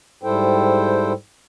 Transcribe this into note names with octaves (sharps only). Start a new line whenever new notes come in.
G#2 G3 E4 A4 C5 G5